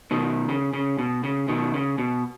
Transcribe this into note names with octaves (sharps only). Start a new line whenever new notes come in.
B2 D#3
C#3
C#3
B2
C#3
B2 D#3
C#3
B2